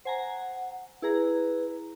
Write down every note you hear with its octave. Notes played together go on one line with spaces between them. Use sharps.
C5 F#5 G#5 A#5
E4 G#4 B4 A#5